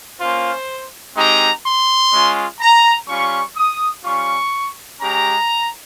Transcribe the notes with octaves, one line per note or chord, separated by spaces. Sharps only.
A#3 C#4 F4 C5
G#3 C4 D#4 G4 A#5
C6
G#3 C#4 F4
A#5
G3 C#4 F4 C#6
D#6
G3 C#4 F4 C#6
G#3 C#4 G4 A#5